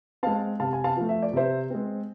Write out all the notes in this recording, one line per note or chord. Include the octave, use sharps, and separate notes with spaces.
G#3 C4 F5 A5
C3 F5 A5
G#5
F5 A5
F3 A3
E5
D5
C3 C5 E5
G#3 C4